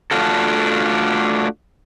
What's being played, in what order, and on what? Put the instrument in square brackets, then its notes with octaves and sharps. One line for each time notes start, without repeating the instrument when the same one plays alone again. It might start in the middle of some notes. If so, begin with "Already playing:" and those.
[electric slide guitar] A3 D4 F4 F#4 A4